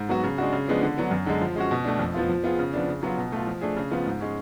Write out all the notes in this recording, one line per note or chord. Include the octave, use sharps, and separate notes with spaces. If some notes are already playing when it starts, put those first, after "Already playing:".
Already playing: G#2
F#3 B3 F#4
C#3
G#3 D4 F#4
C#3
F3 G#3 B3 D4
D3
F#3 B3 D4
F#2
D3 G#3
F3
G#3 C#4 F#4
B2
A3 D4
F2
F3 B3 F4
F3
B3 F4 G#4
C#3
F3 B3 D4
C#3
F#3 B3 F4
B2
A3 F4
F3
A3 D4 G#4
C#3
F3 B3 F4
G#2
G#3 C#4